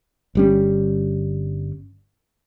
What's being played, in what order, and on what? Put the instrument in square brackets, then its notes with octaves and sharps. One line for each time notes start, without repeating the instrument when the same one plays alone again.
[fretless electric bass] G1 G3 C#4